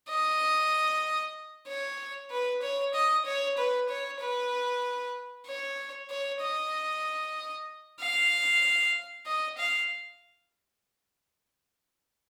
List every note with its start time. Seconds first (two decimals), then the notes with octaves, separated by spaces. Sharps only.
0.10 D#5
1.68 C#5
2.31 B4
2.62 C#5
2.94 D#5
3.26 C#5
3.58 B4
3.89 C#5
4.20 B4
5.47 C#5
6.10 C#5
6.42 D#5
8.00 F5
9.26 D#5
9.58 F5